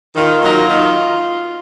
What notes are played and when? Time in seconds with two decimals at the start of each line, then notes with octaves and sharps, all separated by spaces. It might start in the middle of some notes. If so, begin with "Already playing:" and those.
0.16 D#3 F4
0.42 F#3 A#3 D#4
0.68 D#3